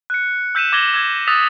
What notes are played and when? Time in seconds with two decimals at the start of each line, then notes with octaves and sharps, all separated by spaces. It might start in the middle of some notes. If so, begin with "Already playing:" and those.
0.10 F#6 C#7
0.55 E6 G6 B6 D#7 E7
0.73 D6 G#6 A#6 B6 F#7 G7
0.94 E6 G6 G#6
1.27 D#6 E6 F#6 A6 B6 F7